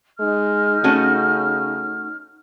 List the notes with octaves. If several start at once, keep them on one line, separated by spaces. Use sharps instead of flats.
G#3 D#4 F6
C#3 A3 C#4 F#4